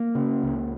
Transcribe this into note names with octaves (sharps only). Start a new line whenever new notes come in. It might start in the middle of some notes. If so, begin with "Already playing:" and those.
Already playing: A#3
C#3
C#2